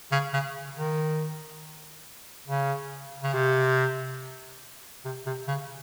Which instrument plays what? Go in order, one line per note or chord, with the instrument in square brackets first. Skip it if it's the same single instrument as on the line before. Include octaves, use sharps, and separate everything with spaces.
[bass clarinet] C#3
C#3
D#3
C#3
C#3
C3
C3
C3
C#3